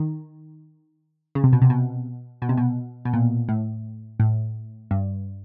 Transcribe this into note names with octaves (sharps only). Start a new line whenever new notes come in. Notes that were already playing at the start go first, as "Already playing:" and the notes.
Already playing: D#3
C#3
C3
B2
C3
B2
B2
C3
B2
B2
A#2
A2
A2
G2